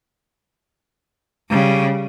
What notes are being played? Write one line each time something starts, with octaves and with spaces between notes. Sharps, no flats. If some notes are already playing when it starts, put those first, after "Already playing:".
C#3 G3